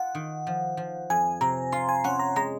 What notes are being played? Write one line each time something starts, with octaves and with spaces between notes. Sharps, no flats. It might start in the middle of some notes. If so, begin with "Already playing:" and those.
Already playing: F4 F#5
D#3
F3
F3
F2 G#5
C3 A#5
F4 C6
G#5
C#4 F#5
A#5
G#3 A#5